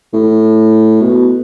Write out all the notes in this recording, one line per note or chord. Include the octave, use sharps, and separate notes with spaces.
A2
B2